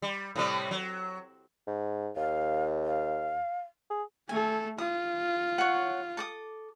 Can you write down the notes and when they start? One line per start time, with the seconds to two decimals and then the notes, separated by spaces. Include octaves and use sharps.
0.02 G3
0.36 A2 C3 G3
0.71 F#3
1.67 G#2
2.16 D#2 F5
2.85 F5
3.90 G#4
4.29 A3 A4 G#5
4.78 F4 D#6
5.58 C#5 F#5
6.17 A4 D6 D#6